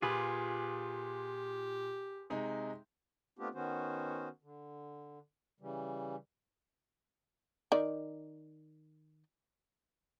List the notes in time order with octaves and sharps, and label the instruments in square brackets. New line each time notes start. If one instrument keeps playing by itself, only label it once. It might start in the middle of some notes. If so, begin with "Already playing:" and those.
[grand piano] A#2 [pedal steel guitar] F4 G#4 B4 [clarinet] G4
[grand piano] C3 G#3 D#4
[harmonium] A3 B3 C4 D4 F4 G4
D#3 B3 C#4 F#4 C5
D3
C#3 E3 G3
[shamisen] D#3 D5